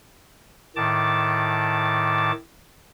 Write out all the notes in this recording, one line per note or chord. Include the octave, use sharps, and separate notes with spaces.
A2 D#3 A5 D6